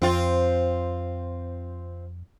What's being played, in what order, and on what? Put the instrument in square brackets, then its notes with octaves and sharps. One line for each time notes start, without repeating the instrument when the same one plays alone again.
[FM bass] F2 [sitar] C4 F4